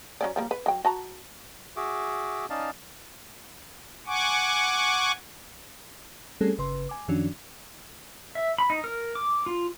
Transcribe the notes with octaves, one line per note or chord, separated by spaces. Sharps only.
F#3 C#4 D5
F3 G3 A#3
B4
F#3 G5
F#4 A5 A#5
F#4 G#4 E5 D6
C#4 D#4 D5 D#5 F5 A5
F#5 G#5 C#6 D6
G3 A3 C4 C#4 G#4 A4
G1 C#3 B4 C6
G#5 D6
F#2 D#3 F3 C#4 D4 F#4
E5
B5
D#4
A#4
D6
F4